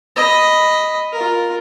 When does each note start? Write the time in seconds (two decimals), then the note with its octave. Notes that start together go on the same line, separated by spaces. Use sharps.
0.16 D#5 B5
1.13 F4 A#4